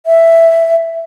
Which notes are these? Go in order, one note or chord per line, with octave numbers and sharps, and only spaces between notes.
E5